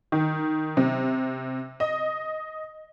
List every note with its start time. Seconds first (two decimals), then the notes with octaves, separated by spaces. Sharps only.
0.12 D#3
0.77 C3
1.80 D#5